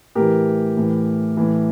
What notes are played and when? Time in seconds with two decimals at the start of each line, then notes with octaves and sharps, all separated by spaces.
0.15 A2 E3 G4 A#4
0.77 A2 E3
1.37 A2 E3